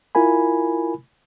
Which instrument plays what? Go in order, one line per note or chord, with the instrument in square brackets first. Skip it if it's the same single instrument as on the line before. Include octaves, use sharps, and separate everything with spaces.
[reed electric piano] E4 F4 A#4 G#5 B5